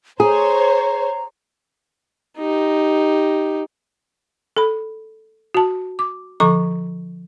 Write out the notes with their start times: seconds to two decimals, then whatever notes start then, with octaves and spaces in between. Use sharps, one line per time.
0.20 G#4 C5 C#5 A#5
2.38 D#4 G4
4.57 A4 B5
5.54 F#4 A5
5.99 D6
6.40 D3 F3 A4 A#5 C#6